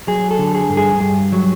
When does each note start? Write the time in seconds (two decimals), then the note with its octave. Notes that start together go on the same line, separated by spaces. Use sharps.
0.07 F#3 G#4
0.31 A4
0.39 D3
0.55 G#4
0.70 G2
0.77 G#4
1.00 G2
1.32 F#3